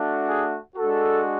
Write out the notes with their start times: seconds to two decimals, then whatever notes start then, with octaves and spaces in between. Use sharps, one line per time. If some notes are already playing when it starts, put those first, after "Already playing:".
Already playing: A3 D4 F#4
0.28 G#4
0.77 G#3 D4 F#4 A4